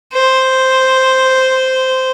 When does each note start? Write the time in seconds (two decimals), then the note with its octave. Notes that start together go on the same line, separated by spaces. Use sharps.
0.13 C5